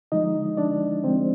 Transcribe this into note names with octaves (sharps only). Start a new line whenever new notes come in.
D3 F3 G#3 D#4 D#5
D4 D5
D3 F3 G#3 C4 C5